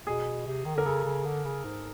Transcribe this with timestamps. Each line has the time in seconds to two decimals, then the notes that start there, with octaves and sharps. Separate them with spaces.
0.07 B2 G#4
0.46 C3
0.65 D#3
0.75 D3 A#4
0.85 C#3 A4
1.05 C#3
1.25 D3
1.44 C#3
1.64 G#2